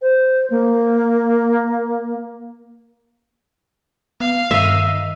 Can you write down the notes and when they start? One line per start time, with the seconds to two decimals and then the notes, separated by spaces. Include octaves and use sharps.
0.02 C5
0.50 A#3
4.20 B3 F5
4.51 G2 D#3 D#5 E5